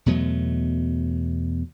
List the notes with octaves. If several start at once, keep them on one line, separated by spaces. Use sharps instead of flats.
E2 B2 F#3 A3